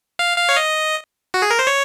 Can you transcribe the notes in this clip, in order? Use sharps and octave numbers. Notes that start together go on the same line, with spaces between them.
F5
F5
C#5
D#5
F#4
G#4
A#4
C5
C#5